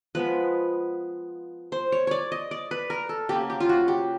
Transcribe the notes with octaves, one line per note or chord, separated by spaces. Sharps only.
F3 G#3 B3 B4
C5
C#5
C#5 D5
D#5
D5
B4
A#4
A4
C#3 F#3 A#3 G4
G4
F4
F#4
G4